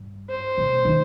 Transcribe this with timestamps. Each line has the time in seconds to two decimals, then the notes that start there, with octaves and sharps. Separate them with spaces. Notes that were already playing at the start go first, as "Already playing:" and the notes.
Already playing: G2
0.30 C5
0.58 B2
0.85 D#3